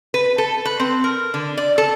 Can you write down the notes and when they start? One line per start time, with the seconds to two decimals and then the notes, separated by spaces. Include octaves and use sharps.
0.14 B4
0.38 A4
0.65 B4
0.79 C4
1.04 A#4
1.34 D3
1.57 D5
1.78 A4